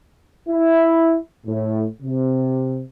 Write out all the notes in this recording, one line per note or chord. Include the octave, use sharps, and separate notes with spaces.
E4
A2
C3